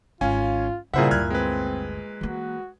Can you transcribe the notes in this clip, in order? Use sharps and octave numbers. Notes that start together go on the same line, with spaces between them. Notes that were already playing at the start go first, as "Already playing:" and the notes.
G#1 C#4 F4 F5 G#5
A#2 C#3 G3 E4 G#4 C5 E5 F#5
G1 D2 F6 F#6 G#6
G#3 C4 B4
E3 A#3 F#4